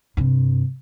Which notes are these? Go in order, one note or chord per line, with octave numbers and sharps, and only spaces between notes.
G2 C3